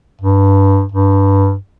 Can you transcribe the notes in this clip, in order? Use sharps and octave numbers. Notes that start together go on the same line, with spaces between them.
G2
G2